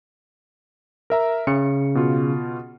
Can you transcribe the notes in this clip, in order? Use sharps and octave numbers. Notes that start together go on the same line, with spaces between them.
A#4 E5 A#5
C#3 C#7
B2 F4